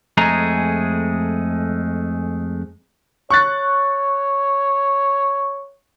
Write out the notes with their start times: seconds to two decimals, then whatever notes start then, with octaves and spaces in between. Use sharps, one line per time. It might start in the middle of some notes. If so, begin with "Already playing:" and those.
0.17 F2 G#3 A3 G#4 A#5
3.30 C#5 C#6 F#6 A6